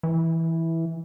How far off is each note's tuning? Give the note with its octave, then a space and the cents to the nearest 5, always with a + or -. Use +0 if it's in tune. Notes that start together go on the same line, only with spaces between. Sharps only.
E3 -10